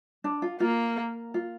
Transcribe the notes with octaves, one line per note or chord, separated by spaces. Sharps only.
D4
F4
A#3 F4
F4